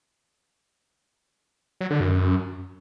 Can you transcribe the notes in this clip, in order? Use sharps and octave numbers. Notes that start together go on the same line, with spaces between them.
F#3
D3
F#2